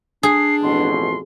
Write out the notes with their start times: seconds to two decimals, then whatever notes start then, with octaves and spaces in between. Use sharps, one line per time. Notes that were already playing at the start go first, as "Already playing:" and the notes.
0.23 D4 G#4 C7
0.63 A1 F2 B2 C6